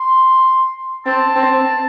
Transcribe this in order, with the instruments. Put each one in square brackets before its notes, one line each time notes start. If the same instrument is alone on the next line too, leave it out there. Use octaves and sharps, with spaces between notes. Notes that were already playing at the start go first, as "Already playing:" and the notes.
Already playing: [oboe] C6
[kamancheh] C4 [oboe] A5
[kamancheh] C4